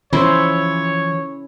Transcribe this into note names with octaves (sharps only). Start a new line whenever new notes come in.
E3 F3 C#4 E4 C5 C#5